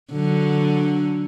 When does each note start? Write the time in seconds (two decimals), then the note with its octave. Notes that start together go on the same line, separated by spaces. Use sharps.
0.12 D3 F#3